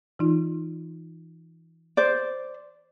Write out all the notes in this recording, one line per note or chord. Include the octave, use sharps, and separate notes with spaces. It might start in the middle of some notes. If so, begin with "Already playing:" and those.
E3 D#4 F4
C5 D5